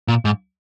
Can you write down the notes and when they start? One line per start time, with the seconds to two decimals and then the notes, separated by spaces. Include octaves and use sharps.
0.08 A#2
0.25 G#2